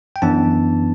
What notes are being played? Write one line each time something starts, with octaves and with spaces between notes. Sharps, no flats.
G5
F#2 E3 B3 D4 A5